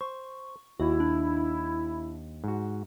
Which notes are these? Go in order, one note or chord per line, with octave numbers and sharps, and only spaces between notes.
C5 C#6
D#2 E4 F#4
D4
G#2 F#4